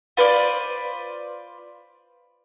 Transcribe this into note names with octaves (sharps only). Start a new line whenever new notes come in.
F4 B4 C5 D5